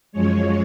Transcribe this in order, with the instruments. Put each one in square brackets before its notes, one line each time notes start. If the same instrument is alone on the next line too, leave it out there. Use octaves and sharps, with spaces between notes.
[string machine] F#2 F3 G#3 C#5